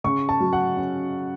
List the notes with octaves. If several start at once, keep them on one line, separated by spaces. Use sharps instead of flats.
C#3 C#6
A5
F#3
F#5
C#4